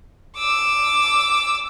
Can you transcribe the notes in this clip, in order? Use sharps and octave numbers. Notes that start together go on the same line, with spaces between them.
D6 E6